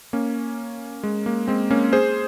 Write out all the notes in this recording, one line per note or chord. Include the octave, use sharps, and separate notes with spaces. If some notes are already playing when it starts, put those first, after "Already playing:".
A#3 C#4
G#3
A#3
G#3 C4
A#3 C#4
G#4 C5